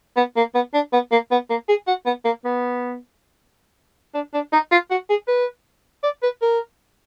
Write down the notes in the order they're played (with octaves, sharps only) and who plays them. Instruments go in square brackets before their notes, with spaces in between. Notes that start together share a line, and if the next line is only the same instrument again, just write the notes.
[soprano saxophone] B3
A#3
B3
D4
B3
A#3
B3
A#3
G#4
F#4
B3
A#3
B3
D4
D4
D#4
F4
F#4
G#4
B4
D5
B4
A#4